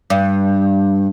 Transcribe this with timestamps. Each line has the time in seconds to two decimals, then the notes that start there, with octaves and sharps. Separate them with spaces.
0.10 G2